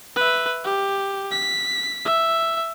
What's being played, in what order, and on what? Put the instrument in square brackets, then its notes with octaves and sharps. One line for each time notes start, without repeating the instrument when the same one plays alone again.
[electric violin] B4 E5
G4
B6
E5